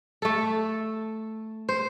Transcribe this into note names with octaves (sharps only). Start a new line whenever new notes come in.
A3 A4
C5